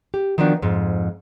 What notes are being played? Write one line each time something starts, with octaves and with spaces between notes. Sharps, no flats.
G4
D#3 F3 A#3 B3 D4 F#4
F2 G#2